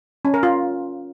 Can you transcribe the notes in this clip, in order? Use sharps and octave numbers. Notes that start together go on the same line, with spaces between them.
C#4
A#4
F4